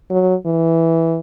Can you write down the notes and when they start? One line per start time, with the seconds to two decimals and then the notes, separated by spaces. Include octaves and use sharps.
0.10 F#3
0.45 E3